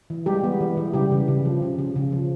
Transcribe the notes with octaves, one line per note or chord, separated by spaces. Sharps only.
E3
G3 G#3 G4
B3
E3
E3
C#3 G3 G4
C#3
C#3
F3
C#3
C#3
C#3
F3